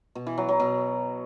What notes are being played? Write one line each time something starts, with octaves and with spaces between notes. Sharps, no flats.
B2
E3
F#3
F#3
B2